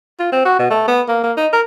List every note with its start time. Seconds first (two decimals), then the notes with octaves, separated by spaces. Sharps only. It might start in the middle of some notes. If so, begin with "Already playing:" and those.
0.20 F4
0.32 C4
0.45 F#4
0.59 B2
0.70 A3
0.88 B3
1.09 A#3
1.24 A#3
1.37 D#4
1.53 A#4